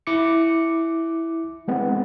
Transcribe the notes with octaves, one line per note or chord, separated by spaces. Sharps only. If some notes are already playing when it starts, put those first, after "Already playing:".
E4 D6 C#7
G#3 B3 C4